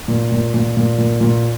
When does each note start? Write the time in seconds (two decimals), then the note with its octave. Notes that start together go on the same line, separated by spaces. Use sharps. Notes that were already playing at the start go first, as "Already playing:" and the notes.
0.08 A#2
0.32 A#2
0.54 A#2
0.77 A#2
0.98 A#2
1.21 A#2